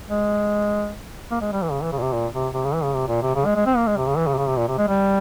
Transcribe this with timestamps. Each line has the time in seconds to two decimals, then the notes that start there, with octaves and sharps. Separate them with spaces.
0.09 G#3
1.31 A#3
1.41 G#3
1.52 G3
1.62 E3
1.71 C#3
1.82 E3
1.92 C#3
1.98 A#2
2.02 C3
2.12 A#2
2.33 C3
2.54 C3
2.64 C#3
2.74 E3
2.84 C#3
2.94 C3
3.08 A#2
3.22 C3
3.35 C#3
3.45 G#3
3.56 G#3
3.66 C4
3.77 A#3
3.87 G#3
3.97 C3
4.07 C#3
4.17 E3
4.27 C#3
4.33 C3
4.37 C#3
4.47 C3
4.57 A#2
4.68 C3
4.78 G#3
4.88 G3